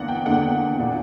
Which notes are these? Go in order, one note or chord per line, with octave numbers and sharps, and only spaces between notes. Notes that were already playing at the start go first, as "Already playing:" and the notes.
Already playing: E2 D3 A#3 D4 F#5
G5
E2 D3 A#3 D4 F#5
A#2 A#3 D4